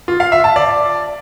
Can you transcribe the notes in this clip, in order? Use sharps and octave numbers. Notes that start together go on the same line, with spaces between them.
F4
F5
E5
A5
D5